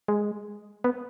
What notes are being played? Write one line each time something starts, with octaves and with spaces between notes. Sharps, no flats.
G#3
B3